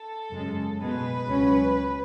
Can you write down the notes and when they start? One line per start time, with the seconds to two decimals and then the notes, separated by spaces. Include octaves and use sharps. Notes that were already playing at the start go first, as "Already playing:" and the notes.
Already playing: A4
0.33 F#2 C#3 G#3
0.80 B2 G#3 B3 B4
1.28 C#2 C#3 F#3 C#4